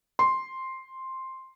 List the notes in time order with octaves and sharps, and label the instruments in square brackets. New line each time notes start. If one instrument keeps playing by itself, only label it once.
[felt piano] C6